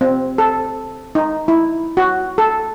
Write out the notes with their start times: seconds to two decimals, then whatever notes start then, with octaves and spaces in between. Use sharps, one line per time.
0.01 C4
0.38 A4
1.15 D#4
1.48 E4
1.97 F#4
2.38 A4